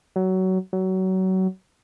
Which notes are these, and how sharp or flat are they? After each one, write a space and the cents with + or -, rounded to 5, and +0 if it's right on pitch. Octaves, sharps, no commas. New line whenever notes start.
F#3 +20
F#3 +25